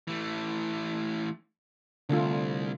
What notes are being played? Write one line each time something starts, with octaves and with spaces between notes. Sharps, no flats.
E3 A3
C2 D3 A3 F4